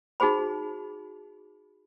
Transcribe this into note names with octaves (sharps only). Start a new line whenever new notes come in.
D#4 F#4 G#4 C5 B5